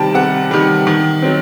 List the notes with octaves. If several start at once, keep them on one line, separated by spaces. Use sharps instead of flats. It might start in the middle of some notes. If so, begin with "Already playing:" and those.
Already playing: C3 D#3 G3 G5 A5
C3 F#5
D#3 G3
D#3
F#3 C4